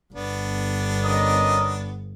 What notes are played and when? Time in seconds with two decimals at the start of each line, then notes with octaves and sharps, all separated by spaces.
0.15 G1 B3 D4
1.05 C#4 A#4 D#5